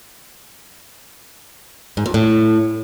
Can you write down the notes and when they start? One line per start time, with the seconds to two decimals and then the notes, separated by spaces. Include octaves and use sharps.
1.97 G#2
2.06 F2
2.14 A2